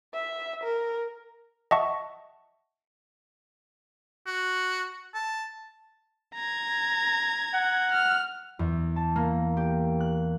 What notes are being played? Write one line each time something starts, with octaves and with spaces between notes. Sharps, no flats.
E5
A#4
D#5 E5 F#5 A5 C#6
F#4
A5
A#5 G#6
F#5
F6
E2
A5
A#3
G4
F#6